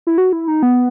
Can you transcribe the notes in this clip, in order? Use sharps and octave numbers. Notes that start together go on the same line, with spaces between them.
E4
F#4
E4
D#4
B3